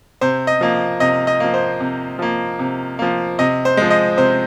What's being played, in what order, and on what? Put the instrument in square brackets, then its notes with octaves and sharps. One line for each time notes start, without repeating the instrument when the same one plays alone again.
[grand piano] C3 C5
D#5
F3 A#3
C3 D#5
D#5
F3 A#3
C5
C3
F3 A#3
C3
F3 A#3
C3 D#5
C5
F3 G#3
D#5
C3 C5